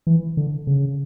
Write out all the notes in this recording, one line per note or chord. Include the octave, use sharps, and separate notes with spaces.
E3
D3
C#3